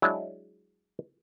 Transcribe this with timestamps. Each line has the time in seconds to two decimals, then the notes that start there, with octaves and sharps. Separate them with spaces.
0.02 F#3 G#3 D4 E4